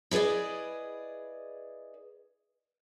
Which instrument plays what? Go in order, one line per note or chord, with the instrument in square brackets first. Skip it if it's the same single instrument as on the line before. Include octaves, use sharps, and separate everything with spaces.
[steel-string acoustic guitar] E4 G#4 B4 D5 D#5